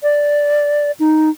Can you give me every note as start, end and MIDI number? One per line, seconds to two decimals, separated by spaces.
0.03 0.91 74
1.00 1.30 63